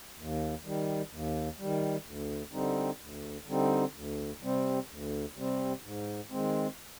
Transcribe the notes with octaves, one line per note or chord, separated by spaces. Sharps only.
D#2
D#3 G3
D#2
D#3 G3
D2
D3 G3 C4 D#4
D2
D3 G3 C4 D#4
D2
C3 G3 C4
D2
C3 G3 C4
G#2
D#3 G#3 C4